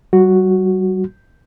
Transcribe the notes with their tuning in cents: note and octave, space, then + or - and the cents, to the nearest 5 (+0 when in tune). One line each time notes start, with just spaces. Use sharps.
G3 -40 F#4 +0